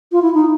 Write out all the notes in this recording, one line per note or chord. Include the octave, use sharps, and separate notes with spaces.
F4
E4
D#4